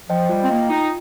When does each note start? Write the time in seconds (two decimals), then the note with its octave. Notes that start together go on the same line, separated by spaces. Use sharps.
0.09 F3 C5 D#5 G5
0.29 G3 F4
0.43 C4
0.49 A#3 D#5 G5
0.69 D#4 F4